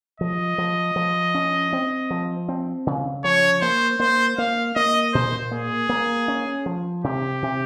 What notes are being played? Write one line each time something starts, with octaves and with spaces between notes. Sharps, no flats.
F3 D#5
F3
F3
C#4
C4
F3
C4
C#3
F3 C#5
A#3 C5
A#3 C5
A#3 F5
A#3 D#5
A#2 C5
A#3 G#4
A#3
C#4
F3
C3 G4
C3